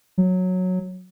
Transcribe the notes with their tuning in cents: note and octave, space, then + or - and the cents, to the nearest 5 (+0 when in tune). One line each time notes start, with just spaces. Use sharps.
F#3 -10